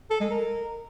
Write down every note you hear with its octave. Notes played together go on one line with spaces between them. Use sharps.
A4
G#3
A#4